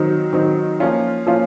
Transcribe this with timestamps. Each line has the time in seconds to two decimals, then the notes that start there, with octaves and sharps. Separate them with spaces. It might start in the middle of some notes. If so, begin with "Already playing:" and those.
Already playing: D#3 F#3 C4 D#4
0.33 D#3 F#3 C4 D#4
0.80 F3 A#3 C#4 F4
1.27 F3 A#3 C#4 F4